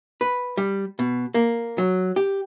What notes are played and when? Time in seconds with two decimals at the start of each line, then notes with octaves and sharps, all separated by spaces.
0.21 B4
0.57 G3
0.99 B2
1.34 A#3
1.78 F#3
2.16 G4